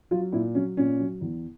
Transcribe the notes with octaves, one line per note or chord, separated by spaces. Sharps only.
F#3 F4
A#2 E4
F#3 C#4
A#2 C#4
F#3
E2